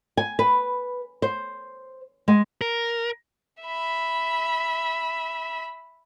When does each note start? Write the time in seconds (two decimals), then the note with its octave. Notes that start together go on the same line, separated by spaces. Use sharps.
0.17 G#5
0.39 B4
1.22 C5
2.28 G#3
2.61 A#4
3.63 E5 B5